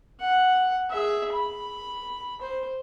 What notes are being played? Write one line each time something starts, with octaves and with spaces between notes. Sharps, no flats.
F#5
G#4 E5
B5
C5